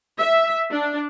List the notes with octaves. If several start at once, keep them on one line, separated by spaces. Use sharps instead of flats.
E5
D4